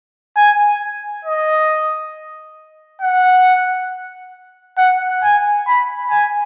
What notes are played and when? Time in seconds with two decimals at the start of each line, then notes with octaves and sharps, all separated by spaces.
0.37 G#5
1.25 D#5
3.01 F#5
4.78 F#5
5.23 G#5
5.67 B5
6.10 G#5